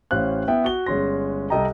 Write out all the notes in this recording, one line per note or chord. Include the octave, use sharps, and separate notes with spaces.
A1 C#4 C5 F5 F#6
B3 E4 E5 G5
F#4 G7
G1 G#3 C#4 C6 A#6
C2 A4 D#5 G5 A#5